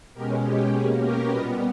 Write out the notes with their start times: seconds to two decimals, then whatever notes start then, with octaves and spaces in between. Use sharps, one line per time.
0.14 B2 G#3 C#4 G4 A#4
0.42 G4
0.71 B2 A#3 C#4 G#4
0.99 G4 A#4
1.26 A#2 G3 B3 B4 D#5